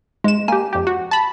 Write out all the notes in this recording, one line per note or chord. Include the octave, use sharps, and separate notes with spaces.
G#2 G#3 E7
A#3 G4 G#5
F2 G4
F#4
A5 B5